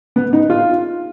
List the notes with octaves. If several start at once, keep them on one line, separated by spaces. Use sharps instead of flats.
B3
D#4
F4